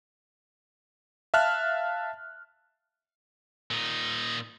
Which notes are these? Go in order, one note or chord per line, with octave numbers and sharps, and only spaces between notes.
E5 F5 A5 F6 F#6
A#2 D#4